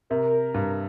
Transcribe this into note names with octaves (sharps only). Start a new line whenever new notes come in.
C3 A#4
G2